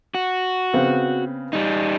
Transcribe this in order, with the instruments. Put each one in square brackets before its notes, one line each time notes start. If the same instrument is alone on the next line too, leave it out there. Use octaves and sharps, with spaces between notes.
[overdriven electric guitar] F#4
[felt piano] C#3 B3 C4
[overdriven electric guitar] G3 D#4